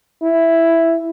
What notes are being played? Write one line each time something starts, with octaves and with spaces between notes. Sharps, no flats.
E4